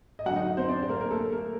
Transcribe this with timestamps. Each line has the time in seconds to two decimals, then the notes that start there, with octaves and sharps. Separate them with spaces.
0.19 D#5
0.25 F#2 D3 F#3 F#4 F#5
0.36 D#4 D#5
0.57 C4 C5
0.68 D4 D5
0.83 C5
0.89 A#3 A#4
1.01 A#4
1.11 A3 A4
1.32 A#3 A#4